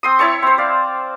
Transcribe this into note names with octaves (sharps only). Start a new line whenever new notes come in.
C4 C6 D#6
E4 C#5 A5 C#6
C4 C5
D5 F5